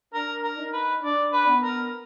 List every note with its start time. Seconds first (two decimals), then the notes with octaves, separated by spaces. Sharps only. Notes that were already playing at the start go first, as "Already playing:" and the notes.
0.14 D4 A#4
0.43 A#4
0.58 D#4
0.73 B4
1.02 D4 D5
1.33 B4
1.48 B3
1.62 A#4